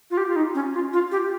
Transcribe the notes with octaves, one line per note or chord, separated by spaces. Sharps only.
F4
G4
F4
D#4
C#4
F4
F4
G4